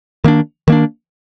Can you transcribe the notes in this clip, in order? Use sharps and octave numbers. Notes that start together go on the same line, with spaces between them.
D#3 A#3 D4
D#3 A#3 D4